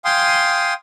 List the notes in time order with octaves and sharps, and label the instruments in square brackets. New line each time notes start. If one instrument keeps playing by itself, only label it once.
[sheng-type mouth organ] F5 G5 G#5 C6 D#6